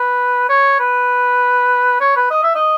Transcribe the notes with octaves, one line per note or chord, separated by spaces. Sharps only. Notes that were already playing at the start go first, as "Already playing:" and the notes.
Already playing: B4
C#5
B4
C#5
B4
D#5
E5
D#5